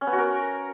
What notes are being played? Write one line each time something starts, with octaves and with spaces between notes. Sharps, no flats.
C#4
B3
F#4
A#4